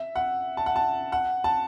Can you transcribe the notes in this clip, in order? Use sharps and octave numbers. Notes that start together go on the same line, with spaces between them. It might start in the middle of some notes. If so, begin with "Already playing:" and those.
Already playing: E5
F#5
A5
F#5
A5
F#5
A5